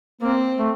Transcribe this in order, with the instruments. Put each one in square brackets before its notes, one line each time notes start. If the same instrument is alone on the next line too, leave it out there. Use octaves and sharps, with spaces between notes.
[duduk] A#3 [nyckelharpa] C4
[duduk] A3